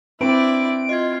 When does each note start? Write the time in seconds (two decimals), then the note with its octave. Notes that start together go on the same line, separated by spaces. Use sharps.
0.21 C4 D4 E4 B4 D5 D7
0.89 F4 D#5 G#6